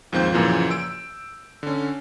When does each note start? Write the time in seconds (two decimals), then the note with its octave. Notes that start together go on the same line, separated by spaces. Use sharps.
0.12 D#2 G#2 F3 C4 F4 G6
0.32 F#2 A#2 C#3 E3 F3
0.71 E6 D7
1.63 D3 C#4